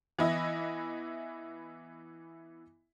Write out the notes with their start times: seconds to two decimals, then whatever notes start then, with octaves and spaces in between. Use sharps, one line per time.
0.19 E3 B3 E4 D#5 E5